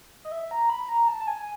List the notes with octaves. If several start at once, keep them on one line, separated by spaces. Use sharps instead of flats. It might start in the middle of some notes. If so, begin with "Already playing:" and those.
D#5
E5
A#5
B5
A#5
A5
A5
G#5